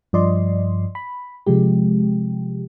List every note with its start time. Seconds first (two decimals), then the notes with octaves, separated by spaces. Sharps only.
0.13 G2 F3 D5 D#5 C6
0.95 B5
1.46 C3 F3 G#3 G4